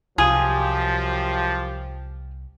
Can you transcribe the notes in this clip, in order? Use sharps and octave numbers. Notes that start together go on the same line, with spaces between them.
C2 F#2 F3 F4 G4 G#4